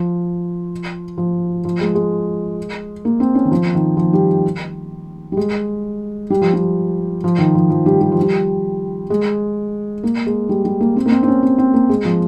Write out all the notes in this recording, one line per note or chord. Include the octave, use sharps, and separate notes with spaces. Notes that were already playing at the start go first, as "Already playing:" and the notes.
Already playing: F3
F3
F3
G#3
G#3
A#3
C4
C#4
D#3
F3
D#3
F3
G3
G3
G#3
G3
F3
G3
F3
D#3
F3
F3
G3
G3
F3
G3
G#3
A#3
G#3
G3
G3
A#3
C4
A#3
C4
C4
C#4
C4
C4
A#3
G#3
F3